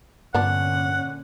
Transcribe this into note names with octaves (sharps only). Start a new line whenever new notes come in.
G2 A#2 D3 F3 B3 C#4 D4 F#5